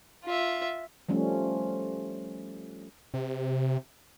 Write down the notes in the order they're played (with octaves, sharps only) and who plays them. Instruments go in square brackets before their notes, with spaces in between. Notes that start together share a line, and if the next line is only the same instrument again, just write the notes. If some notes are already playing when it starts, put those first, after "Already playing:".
[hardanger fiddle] F4 E5
[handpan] F3 G3 A3 C#4
[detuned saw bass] C3